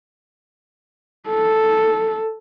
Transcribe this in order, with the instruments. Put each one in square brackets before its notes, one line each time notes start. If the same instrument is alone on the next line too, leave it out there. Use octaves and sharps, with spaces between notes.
[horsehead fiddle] A4